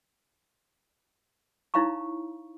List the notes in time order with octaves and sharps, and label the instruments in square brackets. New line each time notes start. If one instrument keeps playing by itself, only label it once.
[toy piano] D#4 E4 C#5 F5 A#5 C#6